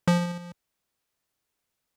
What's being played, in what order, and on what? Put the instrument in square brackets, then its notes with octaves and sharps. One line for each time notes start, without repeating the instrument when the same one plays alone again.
[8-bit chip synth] F3